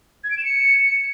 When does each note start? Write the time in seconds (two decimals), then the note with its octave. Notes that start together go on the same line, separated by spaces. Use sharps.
0.24 G#6
0.31 D7
0.38 E7
0.45 C#7